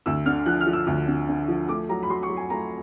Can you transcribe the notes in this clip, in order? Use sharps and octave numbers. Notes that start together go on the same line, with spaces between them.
D2 E6
D3 F6
F3 F#6
F6
F3
E6
D2
D3
D3
F3
A3 D6
F#3 A#5
B5
F#3 C6
C#6
F#3
G#5
A3 A#5